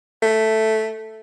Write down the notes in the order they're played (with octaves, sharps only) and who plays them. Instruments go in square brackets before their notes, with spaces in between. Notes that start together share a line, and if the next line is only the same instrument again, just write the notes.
[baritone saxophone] A3